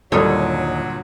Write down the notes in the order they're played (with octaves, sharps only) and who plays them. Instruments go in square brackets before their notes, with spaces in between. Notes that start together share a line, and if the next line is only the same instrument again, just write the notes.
[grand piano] G1 A#2 D#6 [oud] D#2 C#5 [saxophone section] F#3 [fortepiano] G3 A4